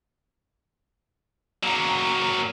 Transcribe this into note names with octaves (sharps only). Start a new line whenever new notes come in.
F#3 A#3